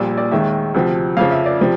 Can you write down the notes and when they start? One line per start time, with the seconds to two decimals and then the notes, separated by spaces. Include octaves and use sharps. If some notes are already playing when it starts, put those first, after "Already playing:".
Already playing: A#1 A#2 G3 D5
0.18 D5
0.31 D#2 D#3 G#3 E5
0.74 D2 C3 F3
1.17 F2 C#3 F3 F5
1.31 E5
1.46 D5
1.61 C3 F3